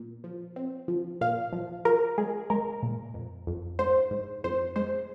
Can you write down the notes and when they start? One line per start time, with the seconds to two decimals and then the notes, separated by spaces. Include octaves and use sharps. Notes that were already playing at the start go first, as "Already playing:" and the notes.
Already playing: A#2
0.24 F3
0.56 C4
0.88 F3
1.21 A#2 F5
1.53 F3
1.85 F3 A#4
2.18 G#3 G#4
2.50 G#3 A#4
2.82 A#2
3.14 F2
3.47 F2
3.79 G#2 C5
4.11 G#2
4.44 F2 C5
4.76 G#3 C5